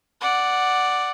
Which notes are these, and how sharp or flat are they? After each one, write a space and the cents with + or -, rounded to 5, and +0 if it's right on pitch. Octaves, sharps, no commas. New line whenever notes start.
D5 +0 F#5 +0